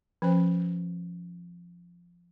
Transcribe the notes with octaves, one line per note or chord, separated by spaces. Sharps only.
F3 C#4 C5